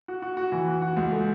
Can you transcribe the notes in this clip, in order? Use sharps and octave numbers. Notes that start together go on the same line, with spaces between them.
F#4
F#4
F#4
E3
F#4
F#4
C#2
A3